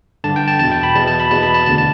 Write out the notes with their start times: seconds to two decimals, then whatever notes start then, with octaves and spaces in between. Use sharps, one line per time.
0.24 G2 D3 A5
0.36 G5
0.48 A5
0.59 E2 B2 A5
0.71 G5
0.83 B5
0.95 E2 B2 A5
1.07 A5
1.20 B5
1.31 E2 B2 A5
1.43 B5
1.54 A5
1.66 D2 D3 A5
1.78 A5